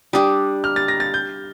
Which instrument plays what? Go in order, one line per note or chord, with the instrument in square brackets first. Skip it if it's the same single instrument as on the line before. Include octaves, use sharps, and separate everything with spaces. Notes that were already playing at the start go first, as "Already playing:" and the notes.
[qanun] G3 D4 G4 [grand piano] D#6
[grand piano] F6
A6
A#6
A6
G6